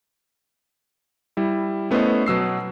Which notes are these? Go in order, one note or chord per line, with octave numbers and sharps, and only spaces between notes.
G3 E4
A3 B3 C#4 E4 C5 D#5
B2 F#3 E6 C7